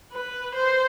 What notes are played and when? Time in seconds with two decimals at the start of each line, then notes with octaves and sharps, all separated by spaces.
0.12 B4
0.55 C5